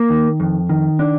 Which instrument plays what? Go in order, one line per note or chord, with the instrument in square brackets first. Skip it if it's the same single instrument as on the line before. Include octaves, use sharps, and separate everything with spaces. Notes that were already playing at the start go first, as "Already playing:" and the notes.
Already playing: [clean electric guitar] A#3
D#3
F2
D#3
D4